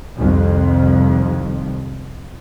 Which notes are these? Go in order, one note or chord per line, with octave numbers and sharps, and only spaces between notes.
C2 F2 D#3